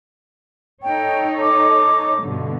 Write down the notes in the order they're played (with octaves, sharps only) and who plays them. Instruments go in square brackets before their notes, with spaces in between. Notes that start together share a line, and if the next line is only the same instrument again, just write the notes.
[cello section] D#4 A4 C#5 [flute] G5
[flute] D6
[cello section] G2 B2 D3